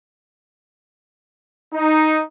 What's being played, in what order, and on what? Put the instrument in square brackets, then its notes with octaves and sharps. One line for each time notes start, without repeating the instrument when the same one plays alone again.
[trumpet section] D#4